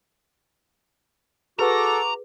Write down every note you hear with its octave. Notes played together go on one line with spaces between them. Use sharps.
F#4 G#4 A4 B4 A#5 D6